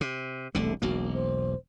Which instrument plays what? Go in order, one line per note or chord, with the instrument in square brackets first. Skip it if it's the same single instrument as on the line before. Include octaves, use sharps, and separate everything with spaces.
[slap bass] C3
[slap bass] E1 C2 D3 [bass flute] A3
[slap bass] E1 B1 A#3 [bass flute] F#4
[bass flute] C5